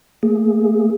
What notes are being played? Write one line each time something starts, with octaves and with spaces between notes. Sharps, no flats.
A3 A#3 G#4